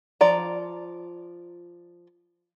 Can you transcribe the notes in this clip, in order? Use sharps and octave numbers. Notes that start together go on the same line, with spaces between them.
F3 D5 A#5